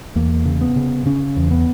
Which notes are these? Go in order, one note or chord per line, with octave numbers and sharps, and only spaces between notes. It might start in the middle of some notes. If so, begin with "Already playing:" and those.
E2 A#3
C#3
B3
C#3
C#3 C#4
E2
B3